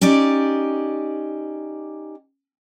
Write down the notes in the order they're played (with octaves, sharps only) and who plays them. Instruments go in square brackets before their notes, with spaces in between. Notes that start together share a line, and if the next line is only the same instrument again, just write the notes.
[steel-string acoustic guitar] C#4 D#4 G4 D5